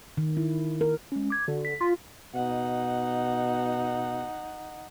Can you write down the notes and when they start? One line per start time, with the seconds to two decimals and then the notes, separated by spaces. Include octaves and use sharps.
0.17 D#3
0.37 E4
0.81 A#4
1.12 G#3 C#4
1.30 D6 G#6
1.48 D3 F#4
1.65 B6
1.81 F4
2.35 B2 D#4 F#5